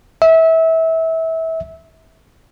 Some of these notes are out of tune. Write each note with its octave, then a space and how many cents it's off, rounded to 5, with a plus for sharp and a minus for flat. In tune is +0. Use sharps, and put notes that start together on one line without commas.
E5 -25